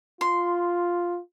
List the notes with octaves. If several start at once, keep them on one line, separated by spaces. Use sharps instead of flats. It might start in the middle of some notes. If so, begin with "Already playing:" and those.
F4 C6